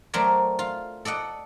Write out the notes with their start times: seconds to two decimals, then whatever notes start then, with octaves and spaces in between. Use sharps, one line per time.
0.14 F#3 A3 C4 A#4 D5
0.59 F4
1.05 A4 D5 D#5 F#5